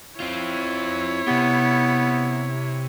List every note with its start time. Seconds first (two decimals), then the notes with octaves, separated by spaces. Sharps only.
0.20 C4 E4 F4 C#5
1.27 C3 B3 G4